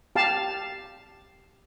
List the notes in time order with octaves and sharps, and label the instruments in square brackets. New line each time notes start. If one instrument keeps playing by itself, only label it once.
[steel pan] G4 F5 A5